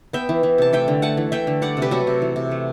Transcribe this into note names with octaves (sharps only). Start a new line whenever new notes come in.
B3 E5 G5
E3
E3
C3 A5
A3 E5 G5
D3
A3 F#5 A5
E3
A3 E5 G5
D3
G3 D5 F#5
C3
G4 B4
F#3 F#4 A4
C3
E3
C3
A3